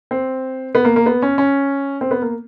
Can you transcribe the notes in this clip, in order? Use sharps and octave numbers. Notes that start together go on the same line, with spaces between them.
C4
B3
A#3
A#3
B3
C#4
C#4
C4
B3
A#3